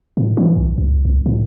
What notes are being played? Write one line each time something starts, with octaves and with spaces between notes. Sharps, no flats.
A2
E3
B1
C#2
C2
A2